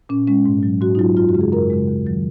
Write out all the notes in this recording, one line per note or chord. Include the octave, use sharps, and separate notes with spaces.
A#2 C#4
G#3 C#4
G#2
F#3
G#2 F#4
D#4
F#3 F4
F#2 F4
F#4
C#3 G#3
G#4
F#2 A#4
C#3 G#3
D#2
D#3 F#3